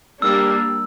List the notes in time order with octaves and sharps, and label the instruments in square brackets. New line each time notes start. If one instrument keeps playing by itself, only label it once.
[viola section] G3 A#3 D4 G4 A#4 [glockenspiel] E6